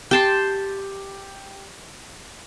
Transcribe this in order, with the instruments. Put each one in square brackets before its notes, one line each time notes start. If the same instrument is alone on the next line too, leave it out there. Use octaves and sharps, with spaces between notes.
[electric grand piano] G4 [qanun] G5 A5 C6